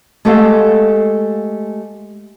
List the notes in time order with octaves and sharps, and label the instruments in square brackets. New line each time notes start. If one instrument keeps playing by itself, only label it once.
[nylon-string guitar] G#3 A3 G4 A4 F5 F#5